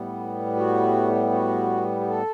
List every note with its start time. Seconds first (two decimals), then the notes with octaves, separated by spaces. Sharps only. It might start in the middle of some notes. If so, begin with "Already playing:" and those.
Already playing: A2 G3 B3
0.56 F#4
1.32 F#4
2.01 G4
2.06 A4